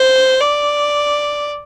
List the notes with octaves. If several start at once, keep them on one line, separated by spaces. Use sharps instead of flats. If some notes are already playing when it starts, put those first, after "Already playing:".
Already playing: C5
D5